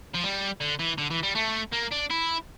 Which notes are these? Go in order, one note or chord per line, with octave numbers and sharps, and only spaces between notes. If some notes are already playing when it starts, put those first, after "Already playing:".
F3
G3
D3
E3
D3
E3
G3
A3
A#3
D4
E4